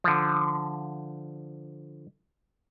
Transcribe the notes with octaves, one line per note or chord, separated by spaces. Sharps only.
D3 F3